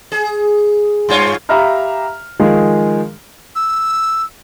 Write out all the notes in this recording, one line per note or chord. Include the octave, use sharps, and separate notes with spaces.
G#4
G2 F4 C#5
G4 E5 F5 A#5 B5 F6
D#3 F3 G#3 F4 G#4
E6